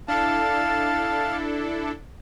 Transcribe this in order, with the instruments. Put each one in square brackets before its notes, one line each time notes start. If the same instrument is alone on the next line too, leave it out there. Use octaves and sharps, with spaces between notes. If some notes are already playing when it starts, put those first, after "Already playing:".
[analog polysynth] D4 E4 A4 [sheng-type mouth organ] F5 A5